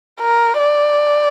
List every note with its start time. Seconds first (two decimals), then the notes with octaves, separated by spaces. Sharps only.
0.21 A#4
0.60 D5